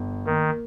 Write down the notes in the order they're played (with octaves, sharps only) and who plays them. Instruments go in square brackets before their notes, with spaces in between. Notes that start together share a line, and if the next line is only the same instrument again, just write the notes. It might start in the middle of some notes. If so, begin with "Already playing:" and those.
Already playing: [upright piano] G1
[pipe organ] D#3 [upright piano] A#3